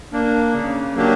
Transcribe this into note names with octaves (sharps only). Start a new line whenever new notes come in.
A#3 D4
C#3
F#3 A#3 D4 G4